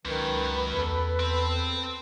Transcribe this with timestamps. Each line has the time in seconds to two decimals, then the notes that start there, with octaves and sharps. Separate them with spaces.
0.05 C#2 F#2 D#3 B4
0.74 E2 A4
1.20 C4